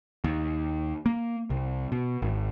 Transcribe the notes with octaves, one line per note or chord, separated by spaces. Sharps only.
D#2
A#3
C2
B2
G#1